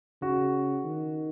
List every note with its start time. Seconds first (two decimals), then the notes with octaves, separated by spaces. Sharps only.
0.22 C#3 F#4
0.84 D#3